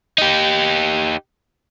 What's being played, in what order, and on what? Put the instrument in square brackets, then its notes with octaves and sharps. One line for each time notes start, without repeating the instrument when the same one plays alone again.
[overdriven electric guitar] D#4 G4